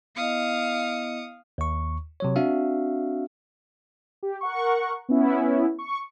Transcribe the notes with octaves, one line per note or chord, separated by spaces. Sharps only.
B3 E4 D#5 F5 D#6 C#7
D#2 C#6
C3 F#3 C#5
C4 D4 F#4 E5 F5
G4
A#4 F#5 C#6
B3 C#4 E4
C#6